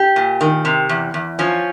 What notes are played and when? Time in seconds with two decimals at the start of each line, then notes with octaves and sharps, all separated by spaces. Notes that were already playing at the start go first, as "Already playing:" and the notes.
Already playing: G4
0.16 A#2
0.41 D#3
0.65 C3
0.89 E2
1.14 E2
1.39 F3 C#4